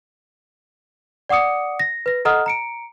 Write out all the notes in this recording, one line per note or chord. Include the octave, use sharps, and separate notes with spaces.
D5 F#5 D6 D#6 C#7
A#6
B4 A#6
A4 D#5 F#5 A#5 D#6 F6
A#5 C#7 D7